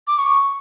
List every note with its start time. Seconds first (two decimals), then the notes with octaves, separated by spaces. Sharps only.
0.07 D6
0.18 C#6